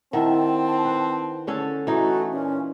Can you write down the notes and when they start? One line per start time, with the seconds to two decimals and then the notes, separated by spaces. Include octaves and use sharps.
0.13 D#3 C4 E4 E5 F#5 A5
0.85 B4
1.47 D3 C#4 A4
1.87 E3 A3 D#4 F#4
2.32 A#2 C#4